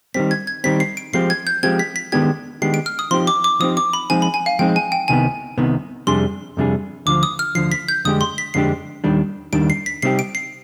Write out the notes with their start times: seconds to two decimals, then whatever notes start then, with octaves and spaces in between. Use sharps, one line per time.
0.14 D#3 G3 C4 B6
0.31 G#6
0.47 G#6
0.64 D#3 G3 C4 B6
0.80 C7
0.97 D7
1.13 F3 G#3 C4 G4 C7
1.30 G#6
1.47 G6
1.63 F3 G#3 C4 G4 G#6
1.79 B6
1.96 B6
2.12 D#3 G#3 B3 D4 G4 G#6
2.62 D#3 G#3 B3 D4 G4 C7
2.74 D7
2.86 F6
2.99 D#6
3.11 F3 C4 D#4 G4 C6
3.27 D6
3.44 D6
3.60 F3 C4 D#4 G4 D#6
3.77 D6
3.93 B5
4.10 F3 G#3 C4 D#4 G#5
4.22 B5
4.34 G#5
4.46 F5
4.59 F3 G#3 C4 D#4 G5
4.76 G#5
4.92 G5
5.08 C2 C3 D#3 B3 G#5
5.57 C2 C3 D#3 B3
6.07 F2 C3 G3 D4 G#4 C6
6.57 F2 C3 G3 D4 G#4
7.06 D2 D3 F3 D6
7.23 D#6
7.39 F6
7.55 D2 D3 F3 C7
7.72 B6
7.88 G6
8.05 F2 D3 G#3 D4 G4 D#6
8.21 C6
8.38 B6
8.54 F2 D3 G#3 D4 G4 C7
9.04 D#2 D#3 G3 D4
9.52 D#2 D#3 G3 D4 D7
9.70 C7
9.86 B6
10.02 C3 G3 C4 D#4 G4 C7
10.19 D7
10.35 C7